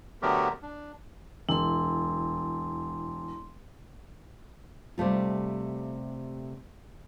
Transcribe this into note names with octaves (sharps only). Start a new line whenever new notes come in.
D3 F#3 A3 B3 G4 A#4
D4
E1 E4 C6
C3 G3 A3 F4